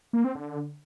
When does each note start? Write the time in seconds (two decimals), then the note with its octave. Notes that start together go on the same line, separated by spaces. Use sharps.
0.13 A#3
0.24 C4
0.35 D3